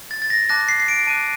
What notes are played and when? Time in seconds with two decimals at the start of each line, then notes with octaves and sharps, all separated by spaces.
0.11 A6
0.22 A6
0.30 A#6
0.49 A5 D6 F#6 A#6
0.68 C7
0.80 C7
0.88 D7
1.07 A5 D6 F#6 D#7